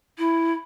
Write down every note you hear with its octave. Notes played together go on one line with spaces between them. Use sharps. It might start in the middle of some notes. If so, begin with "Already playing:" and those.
E4